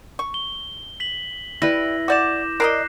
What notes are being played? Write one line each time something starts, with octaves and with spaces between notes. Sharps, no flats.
C#6
G7
B6 F#7
G3 E4 B4 A#6
F#4 D5 D6 G6 E7
A#4 D5 D#5 F#6 A#6 C7